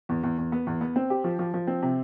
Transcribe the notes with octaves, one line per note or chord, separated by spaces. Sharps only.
E2
E2
E2
B3
E2
B3
C4
G4
F3
F3
F3
C4
C3